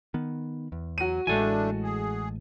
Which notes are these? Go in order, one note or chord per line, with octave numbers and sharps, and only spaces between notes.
D#3 B3
E2
F#3 F#4 D#7
A1 A2 E3 G#3 A3 D4 A4 G#5
G#4